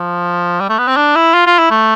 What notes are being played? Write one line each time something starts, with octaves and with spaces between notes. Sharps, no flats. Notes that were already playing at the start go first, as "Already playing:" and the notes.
Already playing: F3
G3
A3
B3
C4
D4
E4
F4
F4
E4
A3